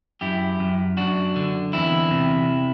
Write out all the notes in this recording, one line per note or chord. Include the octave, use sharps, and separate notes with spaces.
F#2 E4 G4
F#2
F#2 D4 F#4
D3
E2 C4 E4
C3